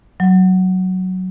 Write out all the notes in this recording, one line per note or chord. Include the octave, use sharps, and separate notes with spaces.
F#3